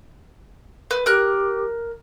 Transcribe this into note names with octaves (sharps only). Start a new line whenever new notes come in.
B4
G4 A#4 F#6